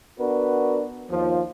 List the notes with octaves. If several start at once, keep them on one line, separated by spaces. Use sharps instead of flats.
B3 D4 F#4 A#4 B4
D#2 F3